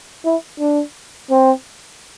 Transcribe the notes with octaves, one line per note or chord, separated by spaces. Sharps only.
E4
D4
C4